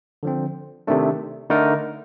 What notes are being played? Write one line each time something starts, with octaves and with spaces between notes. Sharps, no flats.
D3 F3 C4
C3 D#3 A3 D4
D3 A3 D#4 A#4